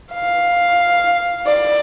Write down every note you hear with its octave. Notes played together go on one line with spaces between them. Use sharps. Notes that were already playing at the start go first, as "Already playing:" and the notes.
F5
D5